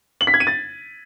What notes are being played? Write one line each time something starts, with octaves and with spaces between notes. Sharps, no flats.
F#7
B6
G#6
D#7
A6